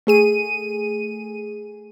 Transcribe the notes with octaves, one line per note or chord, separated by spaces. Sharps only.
A3 G#4 D#7